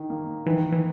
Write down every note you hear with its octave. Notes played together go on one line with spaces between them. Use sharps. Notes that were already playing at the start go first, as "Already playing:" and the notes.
Already playing: D#3
A#3
D#3 E3
E3